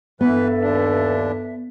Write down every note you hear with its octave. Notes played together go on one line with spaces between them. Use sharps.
G2 E3 B3 A4 B4 E5
D#2 D4